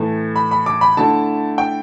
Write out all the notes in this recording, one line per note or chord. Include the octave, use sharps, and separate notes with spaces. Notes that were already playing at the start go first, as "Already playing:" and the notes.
Already playing: A2 E3 A3
B5
B5
D6
B5
D3 A3 E4 A5
G5